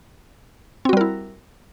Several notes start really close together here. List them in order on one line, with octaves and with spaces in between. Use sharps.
C4 F#4 G3 A#4 E4